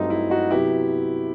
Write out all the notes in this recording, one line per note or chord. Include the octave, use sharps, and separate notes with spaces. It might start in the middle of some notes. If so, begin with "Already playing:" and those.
Already playing: G2 F#3 A3 C4 D#4
E4
D#4 F#4
C3 F#3 B3 E4 G4